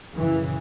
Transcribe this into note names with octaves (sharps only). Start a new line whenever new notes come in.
F#2 C#3 E3